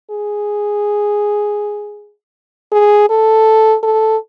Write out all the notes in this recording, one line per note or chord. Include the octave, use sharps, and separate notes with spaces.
G#4
G#4
A4
A4